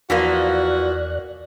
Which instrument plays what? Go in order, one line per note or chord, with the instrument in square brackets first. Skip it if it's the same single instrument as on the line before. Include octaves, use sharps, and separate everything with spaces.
[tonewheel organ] E2 D5 F#6 [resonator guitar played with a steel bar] E3 F3 A#3 [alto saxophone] F#4